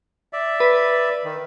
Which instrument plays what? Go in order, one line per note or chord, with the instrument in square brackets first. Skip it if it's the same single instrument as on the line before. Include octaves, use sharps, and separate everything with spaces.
[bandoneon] D5 E5
[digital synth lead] B4
[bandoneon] D#3